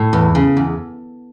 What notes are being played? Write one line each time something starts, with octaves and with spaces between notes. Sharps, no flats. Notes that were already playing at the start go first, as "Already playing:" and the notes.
Already playing: A2
E2
C#3
E2